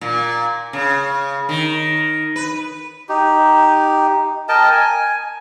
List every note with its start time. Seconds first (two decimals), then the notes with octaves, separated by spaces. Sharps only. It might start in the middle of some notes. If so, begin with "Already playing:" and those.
0.01 A#2
0.73 C#3
1.49 D#3
2.36 B4
3.09 D#4 G4
4.49 A#4 D#5 G5 A5
4.71 G#5